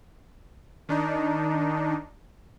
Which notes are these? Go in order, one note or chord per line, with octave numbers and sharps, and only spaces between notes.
D#3 D4 D#4